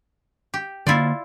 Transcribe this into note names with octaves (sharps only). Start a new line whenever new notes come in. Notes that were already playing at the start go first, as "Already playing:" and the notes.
G4
D3 A#3 E4 F4 D5